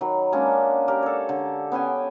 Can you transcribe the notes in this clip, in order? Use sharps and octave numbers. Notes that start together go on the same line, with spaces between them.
D#3 F#3 B5
G#3 A#3 C#4 D4
G4 A#4 D5
A4 C#5
D3
B3 C#4 G5 G#5